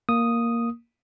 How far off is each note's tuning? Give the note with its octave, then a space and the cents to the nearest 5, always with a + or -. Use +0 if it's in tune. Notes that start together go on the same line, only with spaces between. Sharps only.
A#3 +0 D#6 +0